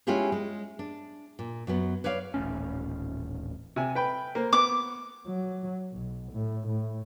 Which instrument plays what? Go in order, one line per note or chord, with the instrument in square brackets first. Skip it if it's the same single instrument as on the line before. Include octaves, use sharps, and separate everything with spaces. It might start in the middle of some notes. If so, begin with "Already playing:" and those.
[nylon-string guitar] G#3 C#4 E4 F4 G4 G#4
G#3
D4
A#2
F#2 F#3 B3
B4 C#5 D5 F5
[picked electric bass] D#1 A1 A2 C#4
[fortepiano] C3 G#5
B4 G5 B5
A#3 C5
[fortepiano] B3 [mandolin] D6
[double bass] F#3
B1
A2
A2